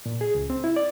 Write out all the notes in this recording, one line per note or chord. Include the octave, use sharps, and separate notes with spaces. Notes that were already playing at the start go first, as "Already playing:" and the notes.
A#2
G#4
C#2
C4
E4
D5